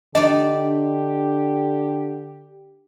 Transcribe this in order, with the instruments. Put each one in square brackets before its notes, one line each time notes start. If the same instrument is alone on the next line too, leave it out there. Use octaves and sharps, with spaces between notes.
[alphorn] D3 [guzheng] D4 D#4 D5 [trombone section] G4 [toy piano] D#5